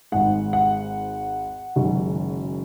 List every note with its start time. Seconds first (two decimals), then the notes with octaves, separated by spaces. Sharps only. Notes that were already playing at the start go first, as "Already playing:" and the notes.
0.12 G#1 G#2 G#3 F#5
0.53 F#5
1.76 F#1 F#2 D#3 G#3